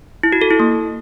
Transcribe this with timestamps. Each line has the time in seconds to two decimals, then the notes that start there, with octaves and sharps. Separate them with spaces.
0.23 E4
0.32 F#4
0.42 A4
0.51 E4
0.60 A#3